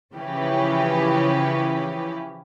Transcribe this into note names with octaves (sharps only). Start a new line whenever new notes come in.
C#3 E3 F3 C#4 G4 B4